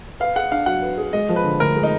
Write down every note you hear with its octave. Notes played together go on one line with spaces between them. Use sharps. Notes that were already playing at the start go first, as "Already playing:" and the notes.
B4 F5
G#4 F#5
D4 F5
F#3 F#5
B4
G#4
G#3 D#5
F3
B4
D3
D2 A#4
G#3
D#4